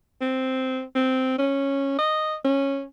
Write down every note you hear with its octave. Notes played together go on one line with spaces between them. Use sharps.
C4
C4
C#4
D#5
C#4